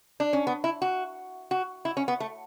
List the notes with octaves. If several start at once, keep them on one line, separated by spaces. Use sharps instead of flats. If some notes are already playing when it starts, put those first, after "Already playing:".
D4
C#4
B3
E4
F#4
F#4
E4
C#4
B3
A3